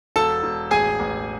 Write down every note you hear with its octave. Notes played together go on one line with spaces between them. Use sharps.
E1 A4 A5
E1
A1 G#4 G#5
A1